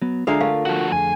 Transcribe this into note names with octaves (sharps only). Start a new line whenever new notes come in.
F#3 B3
D3 G#3 F4 G#4 A4 E5 F5 A#5
A3 F4 A#4 F5
F3 F#4
F2 G#4 G#5